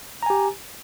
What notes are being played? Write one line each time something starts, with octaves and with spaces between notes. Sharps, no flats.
G4 G#5 A#5